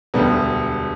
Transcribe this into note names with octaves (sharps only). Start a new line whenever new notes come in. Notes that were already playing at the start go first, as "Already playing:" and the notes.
E1 D2 D3 G3 B3